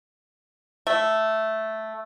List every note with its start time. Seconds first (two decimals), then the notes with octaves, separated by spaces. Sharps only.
0.87 A3